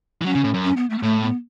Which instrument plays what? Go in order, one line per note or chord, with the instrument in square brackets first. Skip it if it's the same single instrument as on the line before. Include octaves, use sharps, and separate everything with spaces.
[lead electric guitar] E3
[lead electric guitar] F#3 [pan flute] C#4
[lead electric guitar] C#3
A2
F#2
[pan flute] C#4
B3
A3
B3
[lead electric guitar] A2 [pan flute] A3
[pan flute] B3